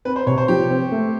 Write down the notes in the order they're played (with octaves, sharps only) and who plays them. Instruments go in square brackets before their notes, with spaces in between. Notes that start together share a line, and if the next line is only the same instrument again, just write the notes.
[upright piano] C4 [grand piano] B4
[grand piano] C5
[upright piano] C3 [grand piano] C#5
[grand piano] C5
[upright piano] F3 [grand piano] G4
[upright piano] C4
A3